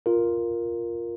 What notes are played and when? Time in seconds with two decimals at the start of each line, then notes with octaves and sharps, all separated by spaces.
0.06 F4 A#4